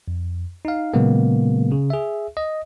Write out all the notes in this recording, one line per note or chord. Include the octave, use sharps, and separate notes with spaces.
F2
D#4 F5
A#2 C#3 F#3 G#3 A#3 B3
C#3
G#4 E5
D#5